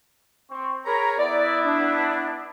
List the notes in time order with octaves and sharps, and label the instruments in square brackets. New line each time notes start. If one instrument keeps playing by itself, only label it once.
[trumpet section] C4 C#6
[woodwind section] G#4 C#5 A#5 [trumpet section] A#4 B5
[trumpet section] B3 E4 [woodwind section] D5
[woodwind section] D4